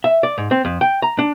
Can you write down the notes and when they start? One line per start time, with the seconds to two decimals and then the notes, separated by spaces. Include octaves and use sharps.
0.04 E5
0.23 D5
0.38 G#2
0.51 C4
0.65 F2
0.81 G5
1.02 A#5
1.19 D4